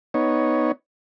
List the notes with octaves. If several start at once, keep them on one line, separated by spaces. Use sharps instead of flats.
B3 D#4 C#5